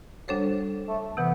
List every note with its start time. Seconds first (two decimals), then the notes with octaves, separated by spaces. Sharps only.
0.28 F#3 G3 D4 A4 C5
0.88 A3
1.17 C3 E3 B3